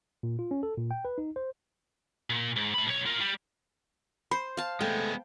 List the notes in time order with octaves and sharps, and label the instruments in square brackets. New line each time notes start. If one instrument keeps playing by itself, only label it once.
[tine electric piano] A#2
F4
C#4
A4
A#2
G5
B4
D#4
C5
[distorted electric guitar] A#2
G#2
A3 B5
B1 C#5
F4 A#4
G3
[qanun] C5 [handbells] B5
[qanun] F5 A5
[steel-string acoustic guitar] C3 A3 [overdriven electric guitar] G#3 B3 [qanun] G5